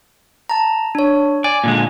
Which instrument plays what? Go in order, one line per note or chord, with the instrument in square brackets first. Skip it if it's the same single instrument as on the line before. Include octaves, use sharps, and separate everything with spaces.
[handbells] A5 A#5
D4 C#5
[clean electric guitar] D5 [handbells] G#5
[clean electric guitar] A#2 D3 G#3